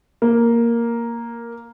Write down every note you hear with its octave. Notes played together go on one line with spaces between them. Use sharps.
A#3